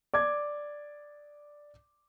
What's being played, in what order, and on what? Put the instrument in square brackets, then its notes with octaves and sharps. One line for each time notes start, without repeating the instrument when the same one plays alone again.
[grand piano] D5 D6 G#6